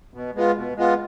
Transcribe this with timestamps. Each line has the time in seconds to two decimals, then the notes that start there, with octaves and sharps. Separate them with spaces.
0.14 B2
0.35 G#3 B3 F4
0.57 B2
0.77 G#3 B3 F4